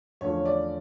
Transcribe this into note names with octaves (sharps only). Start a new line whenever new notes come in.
E2 D3 F3 A3 C#4 C#5
D5